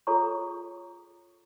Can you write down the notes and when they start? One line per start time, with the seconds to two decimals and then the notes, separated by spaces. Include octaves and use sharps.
0.07 F4 G#4 A4 C#5 A#5 C#6